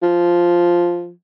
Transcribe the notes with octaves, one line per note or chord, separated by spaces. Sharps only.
F3